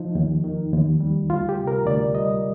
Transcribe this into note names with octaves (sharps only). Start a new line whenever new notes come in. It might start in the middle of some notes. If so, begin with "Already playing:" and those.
Already playing: F3 D#4
D#2
D#3
D#2
G3
D2 F4
G4
C3
A#4
D2 D5
G3 D#5